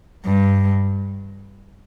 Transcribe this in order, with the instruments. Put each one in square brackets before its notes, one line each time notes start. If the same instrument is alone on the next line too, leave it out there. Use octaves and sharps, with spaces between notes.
[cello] G2